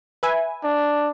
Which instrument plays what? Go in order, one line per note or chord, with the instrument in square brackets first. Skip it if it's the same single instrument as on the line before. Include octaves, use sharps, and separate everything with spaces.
[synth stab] B4 E5 G#5
[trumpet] D4